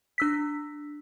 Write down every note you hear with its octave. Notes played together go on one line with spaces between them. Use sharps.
D4 E6 B6